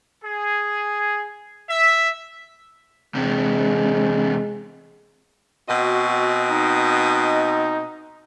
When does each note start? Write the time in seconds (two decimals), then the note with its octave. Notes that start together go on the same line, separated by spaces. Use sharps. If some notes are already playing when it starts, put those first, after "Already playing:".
0.24 G#4
1.68 E5
3.15 E2 C3 G#3
5.69 B2 C4 F#4 D#5
6.50 D#4